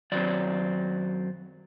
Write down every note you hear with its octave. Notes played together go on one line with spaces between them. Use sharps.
F#2 D#3 F#3 C4 D5